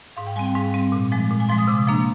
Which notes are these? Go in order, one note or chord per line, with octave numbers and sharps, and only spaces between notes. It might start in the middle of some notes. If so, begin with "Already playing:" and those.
G#2 F5
G5
G3 C4 G#5
G5
G#2 F5
G3 C4
A#2
F3 G#3
A#2
G#5
F3 G#3 C6
D#6
C3 D6
F3 A#3 D4